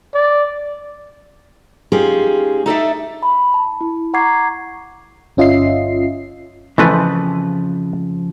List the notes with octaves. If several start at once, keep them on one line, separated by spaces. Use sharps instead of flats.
D5
G#3 C#4 D#4 F4 G4 G#4
D#4 A4 D5 E5
B5
A5
E4
F#5 A#5 C#6 D6 G#6 C7
G1 C#4 F4 D#5 E5 C7
F2 C#3 E3 F3 A3 B4